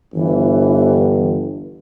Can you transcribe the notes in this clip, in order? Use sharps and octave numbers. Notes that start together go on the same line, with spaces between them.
G1 E3